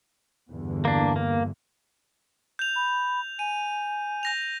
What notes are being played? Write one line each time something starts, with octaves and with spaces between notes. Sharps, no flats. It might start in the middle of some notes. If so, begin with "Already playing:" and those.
E2 G2 D3
A#3 D4
A#3
G6 F7
B5
G#5 D#7
G6 A#6 F7